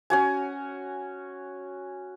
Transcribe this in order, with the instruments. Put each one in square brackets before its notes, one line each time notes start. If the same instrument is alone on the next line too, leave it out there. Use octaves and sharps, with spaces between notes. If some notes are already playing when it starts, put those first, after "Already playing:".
[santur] C#4 F#4 G#5